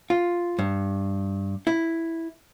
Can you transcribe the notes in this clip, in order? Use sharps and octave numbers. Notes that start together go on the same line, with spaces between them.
F4
G2
E4